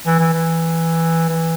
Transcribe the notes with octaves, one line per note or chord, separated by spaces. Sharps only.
E3
E3
E3
E3